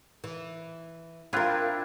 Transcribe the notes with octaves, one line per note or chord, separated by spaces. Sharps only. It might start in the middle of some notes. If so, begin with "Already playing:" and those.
E3
C4 D4 E4 F4 A#4